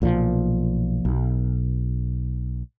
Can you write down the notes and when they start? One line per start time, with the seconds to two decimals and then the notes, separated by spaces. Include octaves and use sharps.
0.02 B1 A#2 E3 F3
1.05 B1